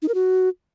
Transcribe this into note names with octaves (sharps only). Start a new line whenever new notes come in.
D#4
A#4
F#4